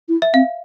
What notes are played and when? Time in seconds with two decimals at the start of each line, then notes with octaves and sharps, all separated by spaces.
0.09 E4
0.22 E5
0.34 C4 F5